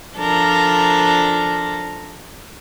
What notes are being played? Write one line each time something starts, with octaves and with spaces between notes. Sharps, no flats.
F3 D4 A4 A#4